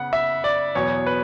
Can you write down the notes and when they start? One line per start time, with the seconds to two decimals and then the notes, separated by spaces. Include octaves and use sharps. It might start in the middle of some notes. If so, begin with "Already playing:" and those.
Already playing: C#3 B3 F#5
0.13 E5
0.44 D5
0.75 E2 B2 F#3 B3 C#5
1.06 B4